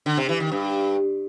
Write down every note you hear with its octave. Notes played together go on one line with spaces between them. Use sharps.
D3
C3
E3
D#3
G2